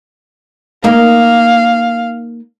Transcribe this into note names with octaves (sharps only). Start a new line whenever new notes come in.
A#3 D#4 F5